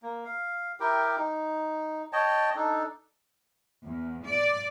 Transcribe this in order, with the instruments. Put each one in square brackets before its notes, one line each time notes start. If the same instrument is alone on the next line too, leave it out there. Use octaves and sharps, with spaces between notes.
[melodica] A#3
F5
E4 G4 A#4 G5
D#4
C#5 D#5 G5 A5
D4 D#4 A4
[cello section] E2
D5